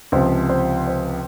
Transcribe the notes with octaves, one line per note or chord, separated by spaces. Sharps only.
C#2 C3 F3 C5
C5
C5